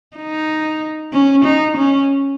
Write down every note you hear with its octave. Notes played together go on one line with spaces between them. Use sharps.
D#4
C#4
D#4
C#4